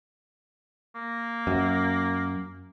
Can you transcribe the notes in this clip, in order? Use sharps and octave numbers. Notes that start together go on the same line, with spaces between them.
A#3
F#2